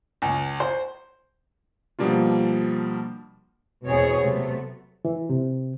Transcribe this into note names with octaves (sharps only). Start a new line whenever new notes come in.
C#2
C5
B2 F3 G3 A#3 D4 F4
E2 B2 B3 C4 G#4 C#5
C3 F#3 A3 B3
E3
C3